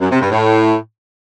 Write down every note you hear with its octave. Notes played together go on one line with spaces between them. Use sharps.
F#2
C3
G2
A2